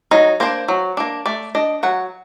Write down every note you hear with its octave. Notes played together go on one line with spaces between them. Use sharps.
F#3 D#4
A#3 D4 C5
F#3
A#3 D4
A3 D5
D4 D#5
F#3 F#5